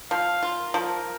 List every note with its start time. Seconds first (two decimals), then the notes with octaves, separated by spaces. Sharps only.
0.11 F3 F5
0.43 F4
0.59 A#4
0.74 F3